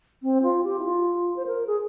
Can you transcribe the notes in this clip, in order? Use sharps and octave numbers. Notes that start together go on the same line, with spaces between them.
C4
F4
G4
E4
F4
C5
A#4
G#4